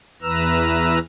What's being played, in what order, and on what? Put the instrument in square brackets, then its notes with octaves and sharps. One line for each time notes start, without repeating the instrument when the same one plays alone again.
[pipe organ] E2 E3 B4 A#5 E6 F6